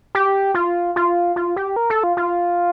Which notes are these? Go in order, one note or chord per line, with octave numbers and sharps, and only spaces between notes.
G4
F4
F4
F4
G4
A#4
A4
F4
F4